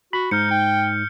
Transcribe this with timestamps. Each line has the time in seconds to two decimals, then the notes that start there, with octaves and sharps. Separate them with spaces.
0.13 F#4 B5
0.31 G#2 D#4 F6 G6 C#7
0.51 G5